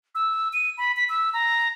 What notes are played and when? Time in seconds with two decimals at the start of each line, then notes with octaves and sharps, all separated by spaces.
0.15 E6
0.53 D#7
0.78 B5
0.97 B6
1.09 E6
1.34 A#5